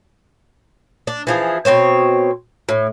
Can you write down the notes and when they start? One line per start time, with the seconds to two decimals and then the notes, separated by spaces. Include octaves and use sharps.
1.07 D4
1.27 E3 F3 G#4
1.65 B2 C4 C5 C#5
2.69 A2